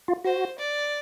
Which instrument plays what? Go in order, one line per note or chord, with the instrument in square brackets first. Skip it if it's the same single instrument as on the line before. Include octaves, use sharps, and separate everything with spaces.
[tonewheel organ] F4
[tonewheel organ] F#4 [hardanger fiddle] C5
[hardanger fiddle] D5